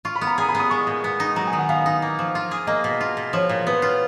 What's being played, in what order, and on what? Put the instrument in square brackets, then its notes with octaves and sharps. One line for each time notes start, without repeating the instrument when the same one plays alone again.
[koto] F4 [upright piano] C#6
[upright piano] B5
[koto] B3
[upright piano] A#5
[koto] G#4 [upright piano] A#5
[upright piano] B5
[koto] B3
[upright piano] D#6
[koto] G#3 [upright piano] C#6
[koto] A#2
B3
D#4
[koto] F#3 [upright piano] A#5
[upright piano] G#5
[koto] D#3
[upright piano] F#5
[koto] B3 [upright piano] F5
[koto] D#4
A#3
F3
F4
G#4
[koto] A#3 [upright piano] D#5
[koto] B2
F4
B2
[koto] F3 [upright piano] C#5
[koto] A#2
[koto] B3 [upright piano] B4
[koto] F4